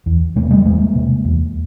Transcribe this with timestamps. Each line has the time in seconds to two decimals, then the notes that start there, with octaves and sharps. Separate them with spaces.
0.06 E2
0.36 C3 A3
0.43 A#3
0.51 G3 A3
0.65 E2 G#3 A#3
0.95 C3
1.25 E2